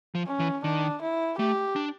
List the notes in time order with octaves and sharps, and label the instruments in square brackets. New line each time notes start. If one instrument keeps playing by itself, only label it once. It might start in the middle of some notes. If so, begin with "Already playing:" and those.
[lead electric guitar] F3
[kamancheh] C#4
[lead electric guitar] E3
[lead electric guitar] D#3 [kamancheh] D4
[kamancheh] E4
[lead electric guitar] A3 [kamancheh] G4
[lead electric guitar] D4